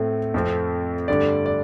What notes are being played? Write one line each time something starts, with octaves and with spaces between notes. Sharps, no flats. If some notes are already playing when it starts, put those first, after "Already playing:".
Already playing: A2 A3 C4
F2 F3 A3 C4
G2 D3 A3 D5
D5